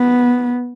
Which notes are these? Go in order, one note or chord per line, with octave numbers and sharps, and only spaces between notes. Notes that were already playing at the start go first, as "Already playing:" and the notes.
Already playing: B3